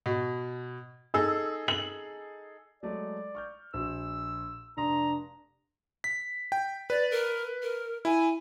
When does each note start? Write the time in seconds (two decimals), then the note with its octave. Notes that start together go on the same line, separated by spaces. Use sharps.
0.06 B2
1.14 D#4 G#4 A4 E6
1.68 F#7
2.83 F#3 G#3 A3 D5
3.35 C#6 F6 G6
3.74 A#1 F#4 E6
4.77 F1 D4 A#5 C6 D#6
6.04 B6
6.52 G5
6.90 B4 D5
7.11 A#4
7.62 A#4
8.05 E4 G#5